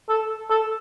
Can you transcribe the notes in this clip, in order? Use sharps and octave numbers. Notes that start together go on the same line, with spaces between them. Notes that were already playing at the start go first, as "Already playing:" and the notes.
A4
A4